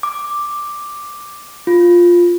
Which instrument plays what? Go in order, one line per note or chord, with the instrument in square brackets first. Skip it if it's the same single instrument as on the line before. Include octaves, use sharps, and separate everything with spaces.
[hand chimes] D6
F4